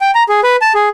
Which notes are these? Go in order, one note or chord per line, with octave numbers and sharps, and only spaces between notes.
G5
A#5
G#4
B4
A5
G#4